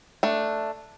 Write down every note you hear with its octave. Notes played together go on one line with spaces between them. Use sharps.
A3 D4